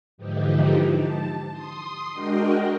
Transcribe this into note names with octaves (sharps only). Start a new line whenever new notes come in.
G#2 D3 E3 F3 D#4 G4
A5
C6 D#6
G#3 D4 F#4 A#4 D#5 G5